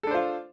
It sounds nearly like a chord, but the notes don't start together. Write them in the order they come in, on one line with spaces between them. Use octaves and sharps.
A4 D4 C5 F4